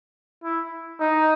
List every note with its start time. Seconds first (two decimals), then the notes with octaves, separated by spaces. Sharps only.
0.44 E4
1.00 D#4